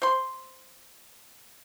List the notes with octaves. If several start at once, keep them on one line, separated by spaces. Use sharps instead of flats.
C5 C6